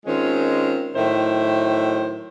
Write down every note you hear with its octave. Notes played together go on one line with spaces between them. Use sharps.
D#3 G#3 C4 C#4 F4
A2 D#3 F#3 C5 E5